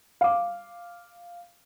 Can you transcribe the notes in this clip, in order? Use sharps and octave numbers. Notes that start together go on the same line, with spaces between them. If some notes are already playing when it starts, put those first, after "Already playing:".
F5 D6